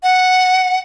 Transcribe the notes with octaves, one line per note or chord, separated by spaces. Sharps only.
F#5